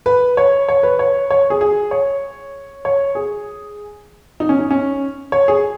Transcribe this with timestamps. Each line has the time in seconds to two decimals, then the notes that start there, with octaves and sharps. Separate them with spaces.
0.06 B4
0.37 C#5
0.69 C#5
0.83 B4
0.99 C#5
1.30 C#5
1.50 G#4
1.61 G#4
1.91 C#5
2.85 C#5
3.15 G#4
4.40 D#4
4.49 C#4
4.59 D#4
4.71 C#4
5.32 C#5
5.48 G#4